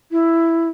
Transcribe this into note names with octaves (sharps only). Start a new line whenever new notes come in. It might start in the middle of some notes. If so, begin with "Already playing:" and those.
E4